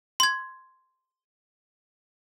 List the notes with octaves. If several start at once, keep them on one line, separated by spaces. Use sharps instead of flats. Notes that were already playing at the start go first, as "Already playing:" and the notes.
C6 G#6